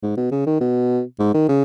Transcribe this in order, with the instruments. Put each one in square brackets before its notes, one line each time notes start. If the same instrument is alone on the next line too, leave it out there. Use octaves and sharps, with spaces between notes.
[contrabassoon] G#2
B2
C#3
D#3
B2
G#2
D#3
C#3